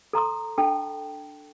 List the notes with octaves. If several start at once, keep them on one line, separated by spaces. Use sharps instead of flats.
A4 A#5 C6 D#6
D4 A4 G5 A5